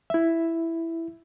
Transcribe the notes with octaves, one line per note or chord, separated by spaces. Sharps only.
E4 E5